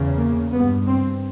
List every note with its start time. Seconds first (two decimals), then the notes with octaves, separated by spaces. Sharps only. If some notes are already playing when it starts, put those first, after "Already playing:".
Already playing: E2 C#3
0.17 A#3
0.51 G2 B3
0.86 C4